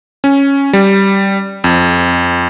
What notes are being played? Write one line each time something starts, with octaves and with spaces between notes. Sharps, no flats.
C#4
G3
F2